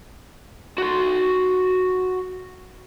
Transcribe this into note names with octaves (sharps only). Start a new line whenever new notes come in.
F#4 C6